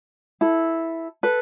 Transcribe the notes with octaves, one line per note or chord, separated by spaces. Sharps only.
E4 A4
A4 B4